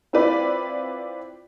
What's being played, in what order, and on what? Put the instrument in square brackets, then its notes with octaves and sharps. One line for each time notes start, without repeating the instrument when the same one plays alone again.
[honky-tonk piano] C4 E4 F4 B4 D5